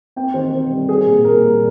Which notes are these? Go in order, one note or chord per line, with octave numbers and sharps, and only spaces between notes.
C4 G5
D#3 C5
C4 C5
G3
A#3 G#4
A#2
A#2 A#4
G3